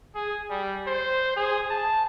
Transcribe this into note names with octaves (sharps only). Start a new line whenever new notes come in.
G#4
G3
C5
G#4
A5